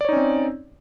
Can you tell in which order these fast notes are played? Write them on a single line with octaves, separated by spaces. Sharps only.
D5 C#5 D#4 C#4 C4